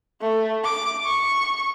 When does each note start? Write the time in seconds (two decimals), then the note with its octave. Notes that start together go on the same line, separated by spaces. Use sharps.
0.22 A3
0.64 D6
1.06 C#6